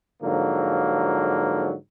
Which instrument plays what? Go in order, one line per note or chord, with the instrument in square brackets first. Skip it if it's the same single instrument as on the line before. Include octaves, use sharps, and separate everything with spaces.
[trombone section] G#2 D3 F3 F#3 A#3